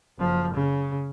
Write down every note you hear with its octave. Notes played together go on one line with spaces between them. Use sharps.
F#1 F3
C#3